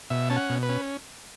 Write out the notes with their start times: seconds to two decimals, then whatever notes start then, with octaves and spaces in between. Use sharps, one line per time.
0.10 B2 E5
0.30 C#4 A5
0.36 F#5
0.50 B2
0.63 B4
0.69 C#4